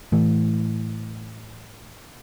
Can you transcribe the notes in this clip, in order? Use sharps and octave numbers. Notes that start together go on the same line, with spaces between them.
A2 E3 A3